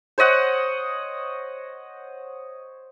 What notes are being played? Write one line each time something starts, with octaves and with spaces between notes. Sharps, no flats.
C5 C#5 D#5 F#5